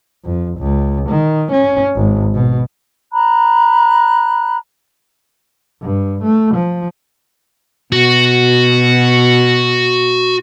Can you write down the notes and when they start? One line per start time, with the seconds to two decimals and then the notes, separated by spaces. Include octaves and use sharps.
0.25 F2
0.58 C#2
1.10 D#3
1.52 C#4
1.95 G#1
2.34 B2
3.12 A#5 B5 F#6
5.81 G2
6.23 A3
6.55 F3
7.92 B2 F#4